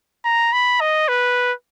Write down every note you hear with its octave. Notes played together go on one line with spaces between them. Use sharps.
A#5
B5
D#5
B4